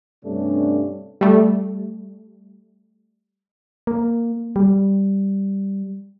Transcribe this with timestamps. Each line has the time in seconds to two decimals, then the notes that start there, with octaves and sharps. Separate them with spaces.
0.23 G2 C3 A3 C#4 D4
1.21 G3 A3
3.87 A#3
4.56 G3